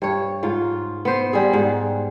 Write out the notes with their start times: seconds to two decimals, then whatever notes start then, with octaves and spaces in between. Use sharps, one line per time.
0.02 G2 C#5
0.43 G#2 F4
1.05 B3 C5
1.33 G3 G#4
1.53 G#2